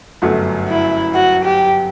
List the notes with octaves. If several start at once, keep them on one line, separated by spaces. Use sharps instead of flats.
G1 F#2 F#3 A3
E4
F#4
G4